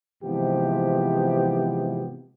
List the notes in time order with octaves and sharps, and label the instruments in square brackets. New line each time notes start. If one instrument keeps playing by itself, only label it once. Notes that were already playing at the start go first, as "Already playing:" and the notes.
[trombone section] G#2 C3 E3 F3 B3 G4